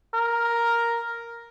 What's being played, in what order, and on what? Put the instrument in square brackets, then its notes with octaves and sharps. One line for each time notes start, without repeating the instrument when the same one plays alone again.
[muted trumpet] A#4